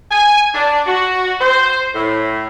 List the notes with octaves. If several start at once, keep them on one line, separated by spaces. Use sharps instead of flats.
G#5
D4
F#4
C5
A2